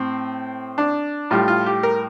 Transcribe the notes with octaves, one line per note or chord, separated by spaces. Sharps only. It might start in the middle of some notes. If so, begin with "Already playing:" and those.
Already playing: A2 C4
D4
A2 G3 F4
F4
G4
A#4